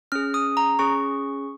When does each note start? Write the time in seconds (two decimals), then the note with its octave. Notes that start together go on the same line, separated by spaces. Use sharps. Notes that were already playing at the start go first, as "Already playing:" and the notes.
0.12 C#4 G#4 F6
0.34 D#6
0.57 A#5
0.79 C#4 G#4 C#6